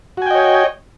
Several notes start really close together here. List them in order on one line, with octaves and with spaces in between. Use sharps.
F#4 G#5 G5 D#5 C#5